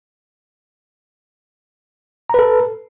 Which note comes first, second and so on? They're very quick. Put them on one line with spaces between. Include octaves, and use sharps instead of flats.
A#5 B4 A4